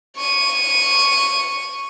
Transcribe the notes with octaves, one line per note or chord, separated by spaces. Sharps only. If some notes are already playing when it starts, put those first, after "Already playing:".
C#6 D#7